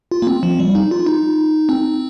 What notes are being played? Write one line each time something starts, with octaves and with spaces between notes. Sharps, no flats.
F4
A#3
C4
F3
G3
D#4
F4
D#4
C4